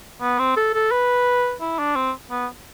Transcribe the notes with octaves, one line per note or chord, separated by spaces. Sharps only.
B3
C4
A4
A4
B4
E4
D4
C4
B3